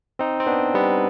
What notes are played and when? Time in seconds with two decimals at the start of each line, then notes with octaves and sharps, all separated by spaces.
0.19 C4 D#4
0.40 C4
0.47 B3 D4
0.74 G3 B3